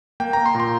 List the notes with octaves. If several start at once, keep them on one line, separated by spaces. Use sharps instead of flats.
A#3 G5
A#3 A#5
C6
A#2
C6